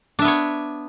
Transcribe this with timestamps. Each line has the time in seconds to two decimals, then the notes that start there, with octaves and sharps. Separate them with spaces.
0.19 D4
0.22 E5
0.24 B3
0.27 C#5